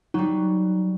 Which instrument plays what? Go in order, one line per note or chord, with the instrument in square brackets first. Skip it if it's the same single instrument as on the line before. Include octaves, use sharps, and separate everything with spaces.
[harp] F#3 G3 [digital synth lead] D#4